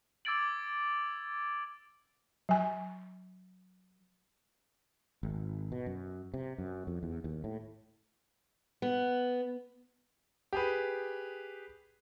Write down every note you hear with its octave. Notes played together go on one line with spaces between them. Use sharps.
D6 E6 G#6 A6 D7 F#7
F#3 G#5
G#1
B2
F#2
C3
F#2
F2
E2
D#2
A2
B3
G4 G#4 B4